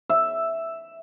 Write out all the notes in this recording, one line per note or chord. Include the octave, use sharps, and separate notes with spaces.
E5